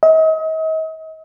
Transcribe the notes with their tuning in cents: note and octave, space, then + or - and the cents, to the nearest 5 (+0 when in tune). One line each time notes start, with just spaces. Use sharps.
D#5 +40